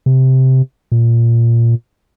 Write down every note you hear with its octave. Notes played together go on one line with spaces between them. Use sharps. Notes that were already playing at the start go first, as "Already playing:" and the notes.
C3
A#2